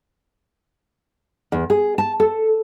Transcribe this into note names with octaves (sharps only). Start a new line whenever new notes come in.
E2
G#4
A5
A4